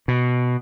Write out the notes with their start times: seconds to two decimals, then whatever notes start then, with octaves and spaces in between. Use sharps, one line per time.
0.08 B2